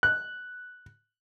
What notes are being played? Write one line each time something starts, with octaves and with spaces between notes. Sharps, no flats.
F#6